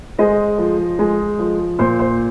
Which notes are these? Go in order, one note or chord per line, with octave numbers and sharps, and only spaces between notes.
G#3 C5 D#5
F3
G#3
F3
A#2 C5
C5